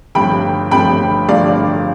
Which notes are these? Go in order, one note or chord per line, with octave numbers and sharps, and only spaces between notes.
G1 G2 F3 A3 G5 B5
G1 G2 F3 A3 G5 B5
G1 G2 F3 A3 D5 F5